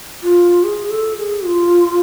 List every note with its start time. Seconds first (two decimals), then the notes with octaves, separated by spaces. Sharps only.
0.23 F4
0.64 G#4
0.90 A4
1.18 G#4
1.45 F4